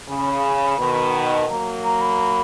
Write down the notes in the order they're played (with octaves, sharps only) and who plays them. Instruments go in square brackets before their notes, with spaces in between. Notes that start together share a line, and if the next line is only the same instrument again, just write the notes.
[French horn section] C#3 [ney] B5
[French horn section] B2 D#3
[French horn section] F#3 A#3 [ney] A#5
[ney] A#5
B5